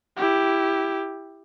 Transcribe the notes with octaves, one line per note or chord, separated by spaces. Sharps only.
E4 G4